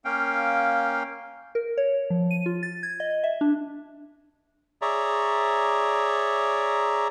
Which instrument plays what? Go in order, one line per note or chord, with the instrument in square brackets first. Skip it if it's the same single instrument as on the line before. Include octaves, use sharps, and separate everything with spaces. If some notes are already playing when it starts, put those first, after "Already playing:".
[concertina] A#3 C#4 F5 G5
[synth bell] A#4
C#5
F3
D#7
F4
A6
G#6
D#5
E5
D4
[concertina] G#4 C#5 D5 E5 A#5